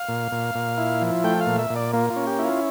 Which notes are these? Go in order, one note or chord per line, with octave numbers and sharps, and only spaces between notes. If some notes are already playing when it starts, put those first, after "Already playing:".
Already playing: F5
A#2
A#2
A#2
E4
F3
A3 G5
F5
A#2
E5
A#2
D5
A#3 F4
F4
C#4
G4
E4
F4